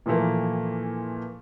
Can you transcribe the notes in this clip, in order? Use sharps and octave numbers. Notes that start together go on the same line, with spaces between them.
A#2 E3 F3 A3 A#3